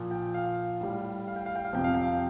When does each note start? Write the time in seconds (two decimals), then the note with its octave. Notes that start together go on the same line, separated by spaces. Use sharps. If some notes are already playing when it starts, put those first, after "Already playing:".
Already playing: A#2 F3
0.11 G5
0.34 F5
0.81 A2 G3
1.28 F5
1.36 G5
1.46 F5
1.56 G5
1.65 F5
1.73 F2 C3 F3 G5
1.84 F5
1.95 G5
2.03 F5